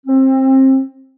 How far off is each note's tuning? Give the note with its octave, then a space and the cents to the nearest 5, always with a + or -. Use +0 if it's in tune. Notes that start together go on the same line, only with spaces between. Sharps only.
C4 +25